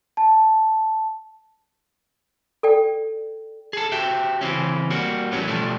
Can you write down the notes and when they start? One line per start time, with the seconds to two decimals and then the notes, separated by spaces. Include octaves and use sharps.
0.17 A5
2.63 A4 D5 G5
3.73 G#4 A4
3.92 F#4 G4 E5 G5
4.41 C#3 E3 C4 C#4
4.91 G3 A#3 F#4
5.32 E2 A2 F#3 B3 C#4
5.48 B2 F3 G3 A3